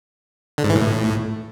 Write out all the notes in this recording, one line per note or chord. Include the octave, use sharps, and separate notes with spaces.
D3
G#2
E3
A2